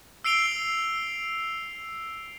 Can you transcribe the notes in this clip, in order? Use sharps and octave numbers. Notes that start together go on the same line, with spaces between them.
E6 C7 D7 F7 G7